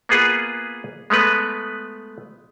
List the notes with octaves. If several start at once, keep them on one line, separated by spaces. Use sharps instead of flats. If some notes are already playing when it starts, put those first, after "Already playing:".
A#3 B3 F4 G#4 B4 F#5
G#3 A3 B3 B4